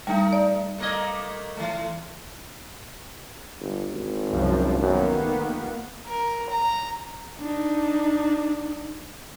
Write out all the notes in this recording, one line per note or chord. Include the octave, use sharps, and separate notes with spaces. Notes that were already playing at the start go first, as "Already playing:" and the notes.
G3 A3 D#4
D5
A3 A#3 D#5
E3 A3
G1
G#1
C2 F#2 F3
F#2 D#3 A#3 B3
F1
A#4
A#5
D4 D#4